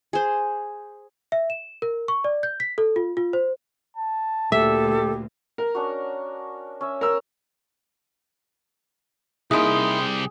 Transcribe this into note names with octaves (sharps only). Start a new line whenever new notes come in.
G#4 C5
E5
E7
A#4
C#6
D5
G6
B6
A4
F4
F4
C5
A5
D2 A#2 G4 A4 E5
A#4
C#4 D4 F#4
C#4 E5
A#4 E6
C2 A#3 D#4 E4 G4 G#4 C6 D#6